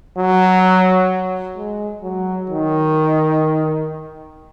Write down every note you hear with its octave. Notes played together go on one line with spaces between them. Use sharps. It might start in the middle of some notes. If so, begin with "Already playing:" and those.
F#3
G#3
F#3
D#3